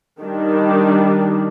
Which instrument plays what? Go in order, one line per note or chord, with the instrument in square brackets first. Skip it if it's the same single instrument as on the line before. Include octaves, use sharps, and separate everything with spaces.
[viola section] D#3 G3 D4